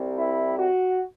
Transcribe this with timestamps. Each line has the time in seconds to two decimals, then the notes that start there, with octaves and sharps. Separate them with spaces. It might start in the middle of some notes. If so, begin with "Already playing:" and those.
Already playing: C2 C3 G3
0.17 E4
0.57 F#4